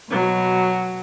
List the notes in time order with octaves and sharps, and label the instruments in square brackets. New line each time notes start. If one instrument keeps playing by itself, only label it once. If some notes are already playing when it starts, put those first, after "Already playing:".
[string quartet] B2 F#3